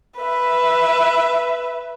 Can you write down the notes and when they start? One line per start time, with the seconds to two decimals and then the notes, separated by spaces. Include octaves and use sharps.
0.19 B4 E5